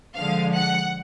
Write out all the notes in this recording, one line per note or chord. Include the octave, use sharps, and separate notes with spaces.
D3 F3 G#3 F5
F#5